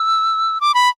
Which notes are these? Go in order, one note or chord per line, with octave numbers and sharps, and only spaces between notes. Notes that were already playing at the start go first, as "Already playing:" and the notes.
Already playing: E6
D6
B5